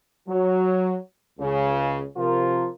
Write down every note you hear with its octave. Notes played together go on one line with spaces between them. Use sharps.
F#3
C#2 C#3
C3 F3 F4 A#4